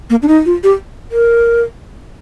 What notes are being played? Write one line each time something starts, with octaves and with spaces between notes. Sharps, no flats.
A#3
D4
D#4
F4
G4
A#4